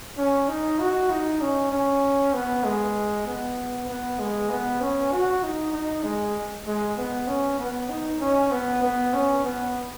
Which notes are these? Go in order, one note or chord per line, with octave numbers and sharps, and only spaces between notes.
C#4
D#4
F#4
D#4
C#4
C#4
B3
G#3
B3
B3
G#3
B3
C#4
F#4
D#4
D#4
G#3
G#3
B3
C#4
B3
D#4
C#4
B3
B3
C#4
B3